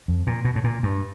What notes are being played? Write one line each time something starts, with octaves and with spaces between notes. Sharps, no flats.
F2
A#2
B2
A2
A#2
G2